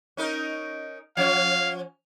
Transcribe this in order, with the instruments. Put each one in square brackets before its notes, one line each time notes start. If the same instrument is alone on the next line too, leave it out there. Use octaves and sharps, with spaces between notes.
[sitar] C#4 D#4 A#4
[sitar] F3 C#4 [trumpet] F5